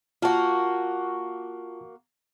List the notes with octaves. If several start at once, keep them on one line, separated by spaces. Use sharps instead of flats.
A#3 F4 F#4 A5